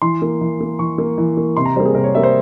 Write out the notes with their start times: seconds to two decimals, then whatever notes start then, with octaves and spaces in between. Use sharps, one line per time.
0.02 E3 C6
0.22 A#3
0.41 E3
0.61 A#3
0.79 E3 C#6
0.98 A#3
1.18 E3
1.37 A#3
1.57 C3 C6
1.66 A#5
1.76 G3 A#3 C5
1.85 G#4
1.94 C3 A#4
2.04 C#5
2.14 G3 A#3 E5
2.23 C5